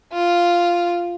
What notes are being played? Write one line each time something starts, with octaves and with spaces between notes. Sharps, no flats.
F4